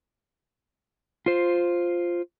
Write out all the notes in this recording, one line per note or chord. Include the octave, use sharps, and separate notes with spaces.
F4 C5